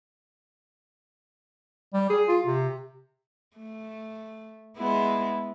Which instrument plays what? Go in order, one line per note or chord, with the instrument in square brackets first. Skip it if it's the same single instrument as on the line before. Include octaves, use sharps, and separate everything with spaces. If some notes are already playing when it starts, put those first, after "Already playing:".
[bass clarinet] G3
G#4
F4
C3
[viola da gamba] A3
G#3 B3 E4